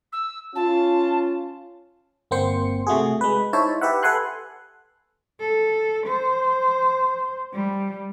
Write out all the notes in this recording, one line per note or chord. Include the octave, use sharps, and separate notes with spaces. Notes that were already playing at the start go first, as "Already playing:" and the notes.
E6
C#4 F4 A5
G1 A#3 C4 C5 C6 C#7
C3 A3 F#4 G#4
G#3 B4
D#4 E4 C5 C#5 E5 A5
G4 B4 E5 F#5
A4 B4 F#5 G#5 C6 F#6
A4
C5
G3